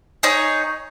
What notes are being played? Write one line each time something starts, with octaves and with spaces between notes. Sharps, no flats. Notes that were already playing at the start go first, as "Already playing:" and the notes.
D#4 G#4 C#5